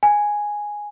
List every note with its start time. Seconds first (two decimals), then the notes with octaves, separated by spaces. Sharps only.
0.03 G#5